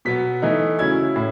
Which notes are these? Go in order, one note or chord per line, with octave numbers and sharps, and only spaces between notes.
B2 F#3 B3 B6
E3 A3 D#4
C#3 F#3 C#4 E4 G#6
A2